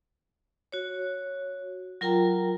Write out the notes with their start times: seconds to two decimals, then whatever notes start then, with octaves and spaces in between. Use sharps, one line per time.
0.72 F#4 C#5
2.01 F#3 F4 A#4 G5 A#5